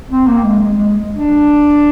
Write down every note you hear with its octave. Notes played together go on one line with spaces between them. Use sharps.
C4
A#3
G#3
G#3
G#3
D4